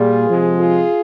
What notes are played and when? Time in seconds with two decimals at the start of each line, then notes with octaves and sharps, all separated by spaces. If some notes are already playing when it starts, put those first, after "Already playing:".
Already playing: A#2 G3 F4 G#4
0.30 C3 F3 G#3
0.59 F4 G#4